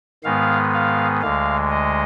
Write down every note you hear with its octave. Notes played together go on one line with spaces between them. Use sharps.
G#2 D#3 G#3 B3 F5
F5
D2 D3 G#3 F5
D#5